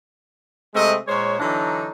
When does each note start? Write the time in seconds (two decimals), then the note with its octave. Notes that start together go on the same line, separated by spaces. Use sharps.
0.74 C3 G#3 A3 C4 D#5
1.07 A#2 G#3 C5 C#5
1.40 D3 E3 F#3 D4 D#4